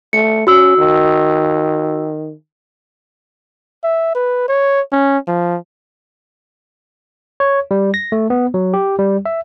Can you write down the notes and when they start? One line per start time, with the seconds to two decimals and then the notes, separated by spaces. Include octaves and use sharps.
0.13 A3 C#7
0.47 C#4 F#4 E6
0.77 D#3
3.84 E5
4.15 B4
4.48 C#5
4.92 C#4
5.27 F3
7.40 C#5
7.71 G3
7.94 A#6
8.12 A3
8.30 B3
8.54 F#3
8.74 G4
8.99 G3
9.26 E5